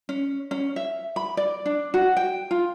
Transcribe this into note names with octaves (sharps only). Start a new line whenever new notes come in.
C#4
C#4
E5
B5
D5
D4
F#4
G5
F4